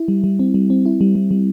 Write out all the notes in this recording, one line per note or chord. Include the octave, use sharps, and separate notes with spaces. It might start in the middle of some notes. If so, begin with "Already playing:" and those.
Already playing: E4
G3
G3
C4
G3
C4
E4
G3
G3
G3